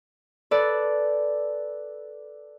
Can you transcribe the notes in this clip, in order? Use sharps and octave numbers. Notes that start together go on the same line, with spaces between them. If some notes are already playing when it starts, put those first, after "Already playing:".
A4 B4 D5